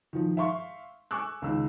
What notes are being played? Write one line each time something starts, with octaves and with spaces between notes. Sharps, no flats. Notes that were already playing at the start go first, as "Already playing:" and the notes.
D#3 F3
E5 F5 C6 C#6
G#5 C#6 D6 E6 F#6
C#2 D#3 E6